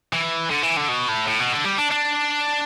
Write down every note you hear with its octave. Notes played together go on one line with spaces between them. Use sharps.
E3
D3
E3
D3
B2
A2
A2
B2
D3
G3
D4
D4